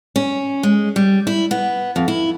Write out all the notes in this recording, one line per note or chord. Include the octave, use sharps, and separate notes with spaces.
C#4
G#3
G3
E4
B3
F2
E4